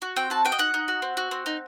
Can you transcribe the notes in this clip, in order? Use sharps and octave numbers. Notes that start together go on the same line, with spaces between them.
F#4
C4 G5
F#4 A5
F#4 G5
D#5
D#4 F#5
D#4
F#4
C4
F#4
C4
D#4